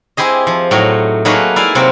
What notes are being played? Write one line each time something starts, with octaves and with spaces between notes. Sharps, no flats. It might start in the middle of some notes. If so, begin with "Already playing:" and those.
C4 E4 G4 G#4 D#5
F3
A2 F#3 D#4 A#5
F#3 A3 A#3 D#4 G#4 B4
E4 D5 F5 G#5
C3 F#3 A#3 C4